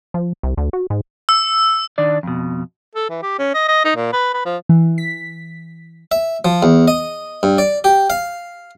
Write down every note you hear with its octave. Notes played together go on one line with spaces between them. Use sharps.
F3
C2
D2
F#4
G#2
E6
D#3 D4 D5
F2 B2
A4
E3
G4
C#4
D#5
D#5
D#4
A#2
B4
B4
F3
E3
B6
E5
F3
E2
D#5
G2
D5
G4
F5